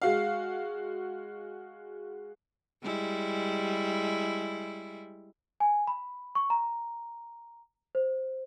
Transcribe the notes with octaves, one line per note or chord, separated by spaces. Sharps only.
G#3 F#4 F5
G3 G#3 E4
G#5
B5
C#6
A#5
C5